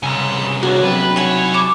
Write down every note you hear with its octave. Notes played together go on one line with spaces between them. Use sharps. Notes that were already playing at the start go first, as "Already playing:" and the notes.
C2 C#3 G#5 A#5
A#3 D4 F#4 G#4 C#5 F#6
C3 F#3 B4
G3 D#4 E4 G#4 C#5 F#5
A5 D6 D#6